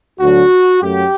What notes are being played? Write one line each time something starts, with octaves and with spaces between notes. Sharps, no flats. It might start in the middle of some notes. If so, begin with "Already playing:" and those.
D2 D3 F#3 F#4
F#2 F#3 A3 G4